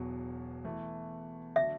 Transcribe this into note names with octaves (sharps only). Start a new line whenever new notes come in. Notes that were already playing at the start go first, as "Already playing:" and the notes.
Already playing: E1 E2 B2 F#3
E2 E3 A3
D3 F#3 A3 D4 E5